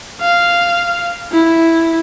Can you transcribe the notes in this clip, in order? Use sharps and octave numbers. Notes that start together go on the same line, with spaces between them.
F5
E4